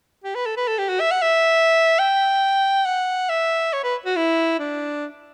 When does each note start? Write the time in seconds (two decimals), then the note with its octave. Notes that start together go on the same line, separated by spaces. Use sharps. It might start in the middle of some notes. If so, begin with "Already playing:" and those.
0.24 G4
0.35 B4
0.46 A4
0.57 B4
0.68 A4
0.78 G4
0.89 F#4
1.00 E5
1.11 F#5
1.22 E5
1.99 G5
2.86 F#5
3.29 E5
3.73 C#5
3.84 B4
4.06 F#4
4.16 E4
4.60 D4